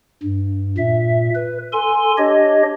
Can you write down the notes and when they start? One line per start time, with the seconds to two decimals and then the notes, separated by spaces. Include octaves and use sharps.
0.23 G2
0.78 A#2 E5
1.35 B4
1.72 A4 G#5 C6
2.18 D4 G4 C#5 D#5